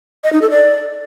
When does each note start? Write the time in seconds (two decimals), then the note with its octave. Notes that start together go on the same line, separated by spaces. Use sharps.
0.24 D#5
0.33 D#4
0.42 A4
0.51 D5